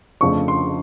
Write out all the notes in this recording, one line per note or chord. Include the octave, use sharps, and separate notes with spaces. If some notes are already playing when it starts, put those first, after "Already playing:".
F2 C#3 F3 A3 D4 C#6
C6